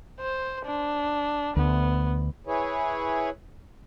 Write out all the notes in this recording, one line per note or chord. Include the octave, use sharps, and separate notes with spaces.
C5
D4
D2 B3
E4 G#4 B4 C#5